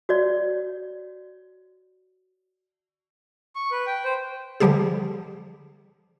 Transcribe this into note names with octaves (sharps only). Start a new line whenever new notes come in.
F#4 C#5 D5
C#6
B4
G5
C5
D3 E3 F3 G3 G4 G#4